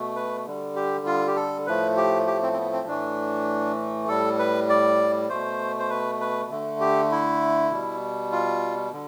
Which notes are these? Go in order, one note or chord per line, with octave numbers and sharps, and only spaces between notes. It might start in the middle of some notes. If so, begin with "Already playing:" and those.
Already playing: B2 A3
B4
D3 G3
G4
F4
G4
A4
A2 F3 A3 B4
G4
G4
C4
C4
B3
C4
A2 E3 A3 D4
A2 G3 A4
B4
D5
B2 A3 C5
C5
B4
B4
D3 A3
G4
E4
B2 G3
F4
D3